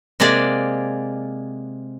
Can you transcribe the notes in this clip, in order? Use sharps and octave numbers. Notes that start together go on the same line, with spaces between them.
C3 G#3 A#3 G#4 D5